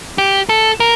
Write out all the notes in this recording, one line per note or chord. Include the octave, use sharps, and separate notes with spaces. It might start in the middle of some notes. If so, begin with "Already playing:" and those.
G4
A4
A#4